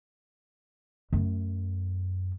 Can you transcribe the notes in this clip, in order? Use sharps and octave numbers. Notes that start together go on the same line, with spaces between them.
F#2 A3